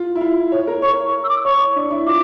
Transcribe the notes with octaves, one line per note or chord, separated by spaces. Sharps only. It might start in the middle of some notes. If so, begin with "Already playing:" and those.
Already playing: F4
E4
F4
C#5
A#4
C#5 C#6
E6
D6
C#5 C#6
D4
E4
F4 D6